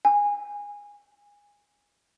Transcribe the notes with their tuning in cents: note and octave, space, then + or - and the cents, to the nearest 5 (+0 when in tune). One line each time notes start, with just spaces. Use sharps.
G#5 -20